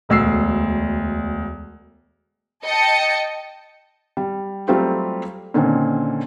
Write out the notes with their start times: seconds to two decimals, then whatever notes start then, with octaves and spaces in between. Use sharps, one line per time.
0.09 E1 D2 E6 C7
2.65 D#5 G5 A5 C#7
4.17 G3
4.68 F#3 G3 A3 C4 F4 G4
5.54 A#2 D3 D#3 C4 C#4